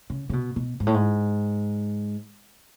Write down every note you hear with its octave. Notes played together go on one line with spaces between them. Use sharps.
C#3
C#3
B2
B2
G#2
A2
G#2